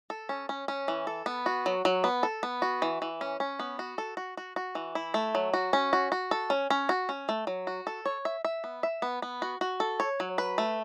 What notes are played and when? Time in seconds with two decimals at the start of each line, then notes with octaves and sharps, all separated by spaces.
0.10 A4
0.29 C#4
0.49 C#4
0.68 C#4
0.88 E3
1.07 A4
1.26 B3
1.46 F#4
1.66 F#3
1.85 F#3
2.04 B3
2.23 A4
2.43 B3
2.62 F#4
2.82 E3
3.02 E3
3.21 C#4
3.40 C#4
3.59 B3
3.79 F#4
3.98 A4
4.17 F#4
4.37 F#4
4.56 F#4
4.75 E3
4.95 E4
5.14 A3
5.35 F#3
5.54 F#4
5.73 C#4
5.93 F#4
6.12 F#4
6.31 A4
6.50 C#4
6.70 C#4
6.89 F#4
7.09 C#4
7.29 A3
7.47 F#3
7.67 F#4
7.87 A4
8.06 C#5
8.25 E5
8.45 E5
8.64 B3
8.83 E5
9.02 B3
9.22 B3
9.42 F#4
9.61 F#4
9.80 A4
10.00 C#5
10.20 F#3
10.38 B4
10.58 A3